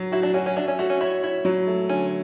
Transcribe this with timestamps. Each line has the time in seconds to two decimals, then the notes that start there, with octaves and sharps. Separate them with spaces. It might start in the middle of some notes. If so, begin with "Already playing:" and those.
Already playing: F#3 F#4
0.12 E4 F#4
0.23 D4
0.34 C#4 F#4
0.46 C#4
0.56 D4 E5
0.68 C#4
0.79 A3 F#4
0.90 C#4
1.01 E4 C#5
1.23 E4 C#5
1.45 F#3
1.67 A3
1.89 D3 C#4